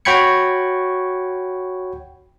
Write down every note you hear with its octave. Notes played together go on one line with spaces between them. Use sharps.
F#4 C#5 G5 B5 G#6 C#7